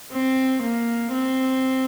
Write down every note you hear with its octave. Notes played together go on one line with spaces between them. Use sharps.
C4
A#3
C4